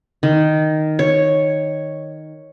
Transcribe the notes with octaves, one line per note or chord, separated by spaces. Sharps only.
D#3
C#5